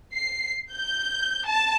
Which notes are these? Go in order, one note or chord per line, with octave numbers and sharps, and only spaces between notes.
C7
G6
A5